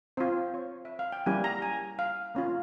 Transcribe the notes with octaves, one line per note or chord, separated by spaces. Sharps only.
C4 F4 C5
C#5
E5
F5
G5
G3 A#3 C#4 E4 G4 G#5
A#5
G#5
F5
A#3 C#4 F4